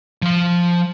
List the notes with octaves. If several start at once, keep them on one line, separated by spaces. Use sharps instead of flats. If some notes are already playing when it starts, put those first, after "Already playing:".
F3 C6